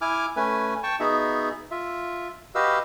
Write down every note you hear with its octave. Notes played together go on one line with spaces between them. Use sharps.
E4 G#5 D6 F6
A3 C#4 B4 G#5
G5 A5 C#6
B3 D#4 F#4 G#4 E5
F4 E5
F#4 G4 B4 D#5 F5 E6